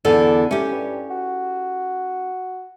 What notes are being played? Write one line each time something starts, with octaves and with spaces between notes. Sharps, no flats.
E2 D3 D4 A4
A3 C#4 G4
G2
F#4